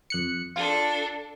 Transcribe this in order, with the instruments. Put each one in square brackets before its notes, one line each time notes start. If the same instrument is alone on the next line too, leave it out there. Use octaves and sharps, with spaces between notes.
[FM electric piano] F2 F#6 C#7
[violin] D4 A4 [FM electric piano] F4